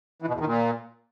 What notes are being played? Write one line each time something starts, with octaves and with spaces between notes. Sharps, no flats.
E3
B2
E2
D#3
A#2